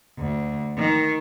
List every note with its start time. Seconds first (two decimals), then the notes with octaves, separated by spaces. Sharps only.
0.19 D2
0.78 D#3